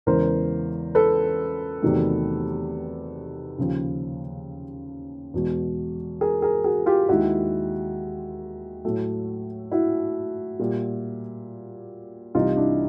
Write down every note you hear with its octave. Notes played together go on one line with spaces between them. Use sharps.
E2 C#3 E3 G#3 A#4 C5
A4 B4
E2 C3 D#3 F#3 A3
D#2 C#3 F3
E2 B2 G#3
G#4 A#4
G#4 A#4
F#4 G#4
F4 G4
D#2 D#3 G#3 E4 F#4
A2 F#3 A3
E4 F#4
A#2 G3
C2 C3 E3 G3 D#4 F4
D4 E4